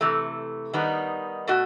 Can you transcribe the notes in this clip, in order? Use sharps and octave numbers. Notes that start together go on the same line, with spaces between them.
C3 E3 A3
D#3 G3 B3 D#4
B2 A3 F#4